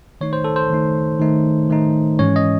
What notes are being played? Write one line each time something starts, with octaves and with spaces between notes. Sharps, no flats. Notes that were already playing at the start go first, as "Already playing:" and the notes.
D#3 A3 D#4 C#5
C5
A4
C5
D#3 A3 D#4
D#3 A3 D#4
D#3 A3 D#4
G#2 E3 G#3 C#4 C#5
D#5